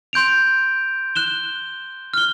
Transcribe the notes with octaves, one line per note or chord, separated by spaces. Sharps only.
C6 G6 D7 F7
F#6 E7 G7
F6 G7